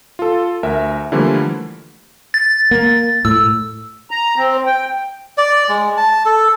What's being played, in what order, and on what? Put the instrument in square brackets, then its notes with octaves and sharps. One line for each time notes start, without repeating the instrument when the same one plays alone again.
[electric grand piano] F4 A4
D2 A#4 E5
D3 E3 F3 G3 A3 A#3
[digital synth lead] A6
[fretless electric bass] A#3
[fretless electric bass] A2 [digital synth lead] E6
[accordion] A#5
C4
G5
[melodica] D5
G#3
A5
A4